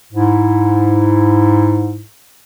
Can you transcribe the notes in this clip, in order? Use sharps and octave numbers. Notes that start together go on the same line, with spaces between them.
G#2 E4